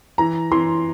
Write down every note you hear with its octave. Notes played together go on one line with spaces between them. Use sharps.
E3 A#5
E3 C6